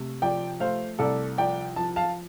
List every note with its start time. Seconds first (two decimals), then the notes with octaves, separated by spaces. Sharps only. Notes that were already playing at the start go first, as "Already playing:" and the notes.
Already playing: C3 A3
0.22 F3 D5 G5
0.60 A3 C5 F5
0.99 C2 A4 D5
1.38 F3 D5 G5
1.76 F3 A5
1.96 F5 A5